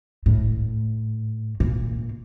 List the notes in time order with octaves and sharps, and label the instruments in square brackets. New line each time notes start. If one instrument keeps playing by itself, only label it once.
[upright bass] A2
A#2